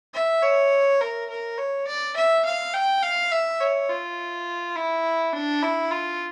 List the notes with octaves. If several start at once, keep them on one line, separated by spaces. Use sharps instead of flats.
E5
C#5
A#4
A#4
C#5
D5
E5
F5
G5
F5
E5
C#5
F4
E4
D4
E4
F4